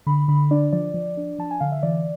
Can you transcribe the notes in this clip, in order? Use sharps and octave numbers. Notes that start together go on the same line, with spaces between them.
D3 B5
D3 B5
D4 D5
F3 D5
F3
D4
F3 A5
G#5
D3 F5
E5
E3 D5